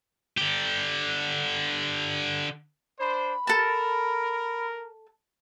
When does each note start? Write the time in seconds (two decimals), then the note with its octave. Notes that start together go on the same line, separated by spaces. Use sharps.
0.38 D3 G4
3.00 D4 C5 B5
3.47 A4 A#4 A5